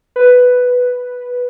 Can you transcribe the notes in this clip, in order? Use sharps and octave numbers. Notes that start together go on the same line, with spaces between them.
B4